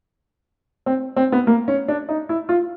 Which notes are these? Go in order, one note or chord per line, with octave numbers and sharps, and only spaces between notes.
C4
C4
B3
A#3
C#4
D4
D#4
E4
F4